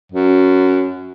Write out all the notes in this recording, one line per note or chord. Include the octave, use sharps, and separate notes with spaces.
F#2